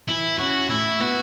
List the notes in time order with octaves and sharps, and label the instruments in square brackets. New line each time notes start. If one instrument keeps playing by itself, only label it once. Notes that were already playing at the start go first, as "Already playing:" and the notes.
[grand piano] E3 [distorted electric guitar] E4
[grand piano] C#4 [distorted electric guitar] F#4
[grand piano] A2 [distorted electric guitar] E4
[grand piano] B3 [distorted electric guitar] F#4